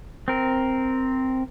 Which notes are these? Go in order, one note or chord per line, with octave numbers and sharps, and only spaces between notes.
C4 A#4